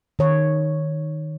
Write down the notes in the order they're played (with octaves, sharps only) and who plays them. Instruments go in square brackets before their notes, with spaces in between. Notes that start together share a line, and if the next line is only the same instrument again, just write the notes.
[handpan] D#3 C#5